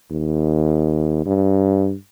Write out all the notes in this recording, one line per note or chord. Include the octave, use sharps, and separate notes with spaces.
D#2
G2